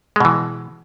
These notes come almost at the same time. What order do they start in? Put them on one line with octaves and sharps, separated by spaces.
G#3 B2 E3